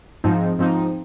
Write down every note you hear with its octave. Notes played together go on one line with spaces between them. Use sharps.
G#2 F3 C4 D#4
G#2 F3 C4 D#4